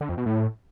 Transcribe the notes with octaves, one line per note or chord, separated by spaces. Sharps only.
D3
F2
B2
A2